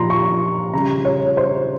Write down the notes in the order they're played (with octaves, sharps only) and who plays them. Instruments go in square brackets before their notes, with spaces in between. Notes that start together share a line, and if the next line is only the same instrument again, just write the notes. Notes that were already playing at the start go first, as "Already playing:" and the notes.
Already playing: [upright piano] A#2 F3 A#5 C6
C#6
C#3 G3 A#5
C#5
C5